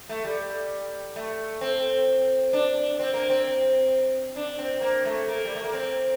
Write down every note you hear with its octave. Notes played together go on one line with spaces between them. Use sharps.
A3
G3
A3
C4
D4
C4
A#3
C4
D4
C4
A#3
A3
A#3
G3
A3
A#3
C4